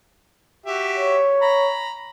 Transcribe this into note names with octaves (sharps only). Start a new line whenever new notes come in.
F#4 G4 E5
C#5
A#5 B5